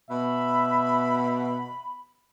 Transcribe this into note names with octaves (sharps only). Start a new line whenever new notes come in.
B2 E5 B5